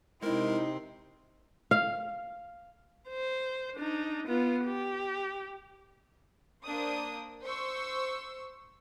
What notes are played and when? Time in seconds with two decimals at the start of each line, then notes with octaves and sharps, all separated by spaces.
0.23 C3 G#3 C4 D#4 E4 A#4
1.71 F5
3.09 C5
3.76 D4 D#4
4.27 B3 F4
4.65 G4
6.64 A#3 D4 C5 D#6
7.44 C5 C#6 E6